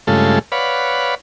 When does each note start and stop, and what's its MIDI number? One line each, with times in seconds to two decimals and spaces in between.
0.07 0.39 43
0.07 0.39 49
0.07 0.39 56
0.07 0.39 57
0.07 0.39 65
0.07 0.39 69
0.52 1.15 71
0.52 1.15 73
0.52 1.15 74
0.52 1.15 77
0.52 1.15 78
0.52 1.15 83